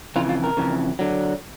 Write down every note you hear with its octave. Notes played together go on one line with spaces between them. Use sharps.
F2 C#3 E3 F4
F4
A#4
F2 C#3 E3
D3 F#3